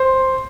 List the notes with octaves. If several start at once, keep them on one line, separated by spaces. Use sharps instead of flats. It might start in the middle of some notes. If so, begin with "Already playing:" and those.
Already playing: C5